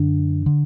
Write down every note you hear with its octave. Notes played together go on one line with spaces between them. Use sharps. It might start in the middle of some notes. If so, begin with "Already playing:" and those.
Already playing: F#2 D3 D4
D3